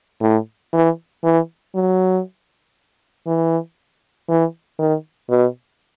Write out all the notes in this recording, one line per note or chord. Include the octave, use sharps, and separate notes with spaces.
A2
E3
E3
F#3
E3
E3
D#3
B2